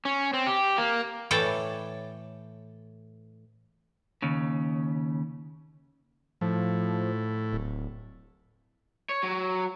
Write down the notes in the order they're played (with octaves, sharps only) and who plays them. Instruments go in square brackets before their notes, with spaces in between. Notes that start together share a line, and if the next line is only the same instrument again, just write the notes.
[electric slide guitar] C#4
C4
G4
A#3
[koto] A2 E3 A4 C#5 D5 G5
[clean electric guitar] D#2 C#3
[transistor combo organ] A2 [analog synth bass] F3
[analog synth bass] D1
[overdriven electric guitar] C#5
F#3